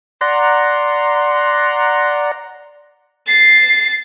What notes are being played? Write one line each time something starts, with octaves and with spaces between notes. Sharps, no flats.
D5 F#5 A#5 C6
A6 C7